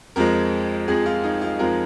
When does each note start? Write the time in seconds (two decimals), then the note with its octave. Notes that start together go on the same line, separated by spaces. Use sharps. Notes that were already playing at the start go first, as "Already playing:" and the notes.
0.16 F2 F3 G#3 A#4
0.88 F2 F3 G#3 G#4
1.06 F4
1.24 D#4
1.42 F4
1.59 F2 F3 G#3 A#4